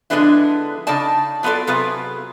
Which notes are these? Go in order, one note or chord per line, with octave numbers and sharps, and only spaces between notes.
D3 F3 G#3 B3 D4 E4
C#3 D4 D#4 D5 A5
F#3 B3 F4 A4 D5
C3 F#3 B3 F4 G#4